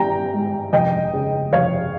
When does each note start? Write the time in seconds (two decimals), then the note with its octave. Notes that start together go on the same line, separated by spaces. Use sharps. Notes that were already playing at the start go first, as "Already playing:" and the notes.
Already playing: G3 G5 A#5
0.33 G#2
0.72 F1 D#5 G5
1.13 C#3
1.53 F1 C#5 F5